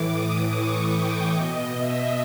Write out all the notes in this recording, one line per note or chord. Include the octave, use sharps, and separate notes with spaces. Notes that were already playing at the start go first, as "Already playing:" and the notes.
Already playing: A2 E3 D6
D#6
C#6
G5
B2 D#5
E5